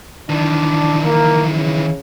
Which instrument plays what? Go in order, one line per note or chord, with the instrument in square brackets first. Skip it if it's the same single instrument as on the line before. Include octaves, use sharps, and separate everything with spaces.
[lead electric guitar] D#3 E3 [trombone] D4
[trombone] A#3
C#3